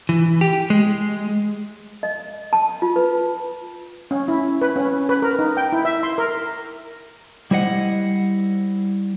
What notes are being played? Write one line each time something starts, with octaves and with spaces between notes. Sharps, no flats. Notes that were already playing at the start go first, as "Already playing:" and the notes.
E3
G4
G#3
D#5
A5
F4
B4
C#4
E4
B4
C#4
B4
A#4
D#4
G5
E4
E5
C6
A#4
G3 E4 C5 D#5 F#5